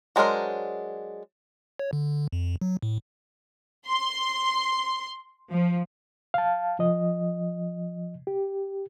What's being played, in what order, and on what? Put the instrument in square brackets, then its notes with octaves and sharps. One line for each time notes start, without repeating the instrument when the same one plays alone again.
[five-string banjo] F#3 G#3 D4 A#4 C5
[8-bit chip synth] C#5
D3
F2
F#3
A2
[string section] C6
F3
[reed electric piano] F5 A5
F3 D#5
G4